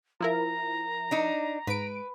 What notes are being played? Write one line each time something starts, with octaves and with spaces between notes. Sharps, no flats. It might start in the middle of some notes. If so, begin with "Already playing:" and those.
F3 E4 A#4 A#5
D4 D#4
G#2 B4 D7